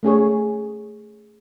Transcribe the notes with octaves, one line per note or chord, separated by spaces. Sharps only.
A3 C#4 G#4 C#5